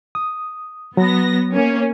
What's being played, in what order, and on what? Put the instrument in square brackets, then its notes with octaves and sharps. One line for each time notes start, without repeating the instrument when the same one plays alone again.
[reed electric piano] D#6
[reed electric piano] F#3 [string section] B3 A#6
[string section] A#3 C#4